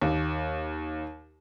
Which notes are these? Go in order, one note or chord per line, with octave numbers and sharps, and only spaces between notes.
D#2